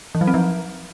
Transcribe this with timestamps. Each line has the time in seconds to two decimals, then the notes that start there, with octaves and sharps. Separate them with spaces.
0.15 E3
0.21 F#3
0.27 C4
0.34 F3